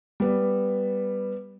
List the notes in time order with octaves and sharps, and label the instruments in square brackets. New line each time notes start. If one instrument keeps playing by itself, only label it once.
[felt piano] G3 B3